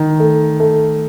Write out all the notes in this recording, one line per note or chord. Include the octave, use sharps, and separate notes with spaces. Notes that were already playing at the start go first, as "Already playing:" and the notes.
Already playing: D#3
A3
A3